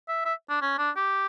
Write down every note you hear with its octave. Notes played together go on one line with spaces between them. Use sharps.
E5
E5
D4
C#4
D4
G4